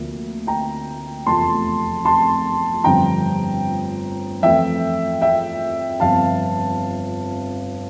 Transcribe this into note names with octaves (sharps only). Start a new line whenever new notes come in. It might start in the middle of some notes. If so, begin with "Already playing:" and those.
Already playing: D2 C3 F3 A#3
G5 A#5
F1 E2 C3 F3 A3 A5 C6
A5 C6
G1 F2 D3 G3 C4 G5 A#5
F2 E3 A3 E5 G5
E5 G5
G1 F2 C3 F5 A5